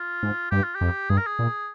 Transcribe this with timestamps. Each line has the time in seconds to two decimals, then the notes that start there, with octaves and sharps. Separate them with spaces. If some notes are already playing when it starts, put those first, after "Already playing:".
Already playing: F4
0.23 G#2
0.51 G2 G4
0.64 F4
0.75 G4
0.81 F2
1.10 G2 G#4
1.18 A#4
1.27 G#4
1.39 A#2